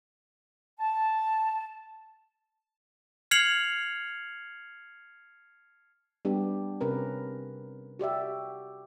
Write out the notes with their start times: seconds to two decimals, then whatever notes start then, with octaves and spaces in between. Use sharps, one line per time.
0.79 A5
3.31 F6 G#6 C7 C#7 F7 F#7
6.25 G3 B3 D4 G4
6.81 C3 C#4 A#4 B4
7.99 F#4 G4 D5 E5